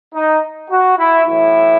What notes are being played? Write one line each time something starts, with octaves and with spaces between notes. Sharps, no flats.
D#4
F#4
E4
B1 A2 E3 E4